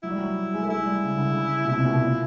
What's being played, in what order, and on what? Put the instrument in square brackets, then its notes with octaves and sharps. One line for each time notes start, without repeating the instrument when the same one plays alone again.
[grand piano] F#3 [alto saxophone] E4
[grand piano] G3
F#3
G#3
A3
[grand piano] G#3 [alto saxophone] E4
[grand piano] G3
C#3
D3
C#3
B2
[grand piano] C3 [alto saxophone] E4
[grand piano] A#2
B2
A#2